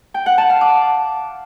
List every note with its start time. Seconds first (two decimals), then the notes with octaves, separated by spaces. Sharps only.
0.14 G5
0.26 F#5
0.38 A5
0.49 F5
0.61 D6